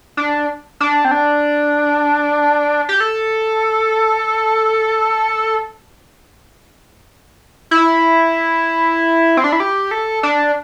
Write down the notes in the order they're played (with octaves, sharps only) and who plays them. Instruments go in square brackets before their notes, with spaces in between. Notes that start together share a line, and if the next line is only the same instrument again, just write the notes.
[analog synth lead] D4
D4
C4
D4
G4
A4
E4
C4
D4
E4
G4
A4
D4